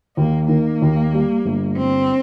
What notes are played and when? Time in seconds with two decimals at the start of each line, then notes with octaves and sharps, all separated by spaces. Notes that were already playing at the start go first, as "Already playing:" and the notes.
0.16 D#2 A#3
0.48 D#3 A#3
0.82 D#2
1.13 G3
1.45 G1
1.77 G1 C4